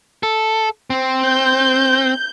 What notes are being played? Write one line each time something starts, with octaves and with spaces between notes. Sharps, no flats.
A4
C4
G6